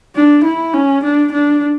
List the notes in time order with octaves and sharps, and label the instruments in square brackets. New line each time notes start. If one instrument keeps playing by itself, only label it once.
[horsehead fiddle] D4
E4
C#4
D4
D4